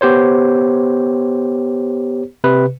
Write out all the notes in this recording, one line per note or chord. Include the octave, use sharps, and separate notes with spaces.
B3 G4 C5 C#5
C3 B4